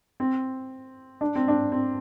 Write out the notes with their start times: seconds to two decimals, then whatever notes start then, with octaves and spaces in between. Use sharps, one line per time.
0.20 C4
1.21 D4
1.36 C4
1.48 D4
1.72 C4